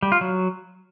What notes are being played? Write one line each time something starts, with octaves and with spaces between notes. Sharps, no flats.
G3
F4
F#3